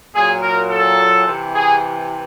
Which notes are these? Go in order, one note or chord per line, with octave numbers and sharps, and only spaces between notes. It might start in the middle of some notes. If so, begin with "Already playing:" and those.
A#2 F#3 G#4
A#4
A4
C3 E3
G#4